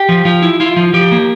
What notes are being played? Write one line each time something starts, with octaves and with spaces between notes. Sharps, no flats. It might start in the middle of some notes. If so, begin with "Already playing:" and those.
Already playing: G4
F3
F3 F4
E4
E4 F4
F3
F3 G4
A#3